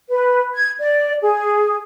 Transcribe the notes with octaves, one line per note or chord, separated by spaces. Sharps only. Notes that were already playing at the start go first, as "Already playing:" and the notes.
B4
G#6
D5
G#4